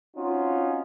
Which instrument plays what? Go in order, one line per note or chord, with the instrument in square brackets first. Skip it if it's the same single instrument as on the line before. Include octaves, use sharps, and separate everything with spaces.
[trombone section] C4 C#4 D#4 F4 F#4